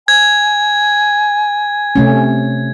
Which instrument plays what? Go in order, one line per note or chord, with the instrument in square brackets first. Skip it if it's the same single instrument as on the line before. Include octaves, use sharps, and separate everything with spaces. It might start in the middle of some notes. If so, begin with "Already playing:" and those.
[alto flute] G#5 [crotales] G#6
[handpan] C3 A3 C#4